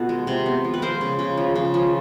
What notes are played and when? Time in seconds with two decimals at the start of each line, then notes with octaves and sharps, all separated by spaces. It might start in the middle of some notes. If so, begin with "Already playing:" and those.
Already playing: B2 B3 F4 A4 B4
0.09 G#3
0.27 C3
0.46 B3
0.64 F3
0.74 B4
0.82 G#3 A#4 C5
1.01 C#3
1.19 C#3
1.37 F3
1.56 C#3
1.74 F3